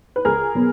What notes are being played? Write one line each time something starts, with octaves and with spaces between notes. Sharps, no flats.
B4
C#2 G#4 A#4
B2 F#3 B3